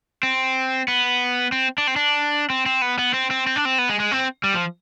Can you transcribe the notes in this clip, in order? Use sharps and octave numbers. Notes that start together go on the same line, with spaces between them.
C4
B3
C4
D4
C4
D4
C4
C4
B3
B3
C4
C4
C4
D4
C4
B3
G#3
G#3
C4
G3
F3